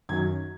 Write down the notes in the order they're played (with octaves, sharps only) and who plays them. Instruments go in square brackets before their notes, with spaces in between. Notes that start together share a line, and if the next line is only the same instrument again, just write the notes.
[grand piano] F#2 D#3 F#3 G#6